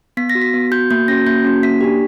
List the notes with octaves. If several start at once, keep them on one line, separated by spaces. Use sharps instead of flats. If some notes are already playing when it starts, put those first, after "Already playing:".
B3 B6
A#6
F#4
B6
B3
F#4 G6
A#3 G6
C#4 F#4 A#6
A#3 G6
C#4 F#4
A#3 B6
D4 G4